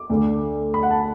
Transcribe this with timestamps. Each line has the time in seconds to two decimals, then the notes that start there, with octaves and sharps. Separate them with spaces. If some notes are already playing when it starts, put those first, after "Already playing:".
Already playing: D6
0.09 D2 D3 A3
0.74 B5
0.83 F#5
0.91 A5